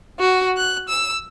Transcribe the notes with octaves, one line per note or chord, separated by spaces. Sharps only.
F#4
F#6
E6